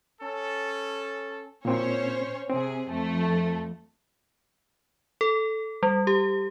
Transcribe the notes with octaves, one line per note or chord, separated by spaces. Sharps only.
C#4 A4
A#2 C4 C#4 C5 C#5
C3 C4 G#4
F2 A3
A4
G3
G4